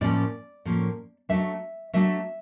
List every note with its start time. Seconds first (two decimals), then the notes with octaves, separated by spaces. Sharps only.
0.01 A2 F3 A#3 C#4 D5
0.65 A2 F3 A#3 C#4
1.29 F#3 A3 D4 E5
1.93 F#3 A3 D4 E5